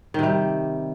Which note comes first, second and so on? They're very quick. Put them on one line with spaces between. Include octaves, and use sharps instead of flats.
D#3 C3 G3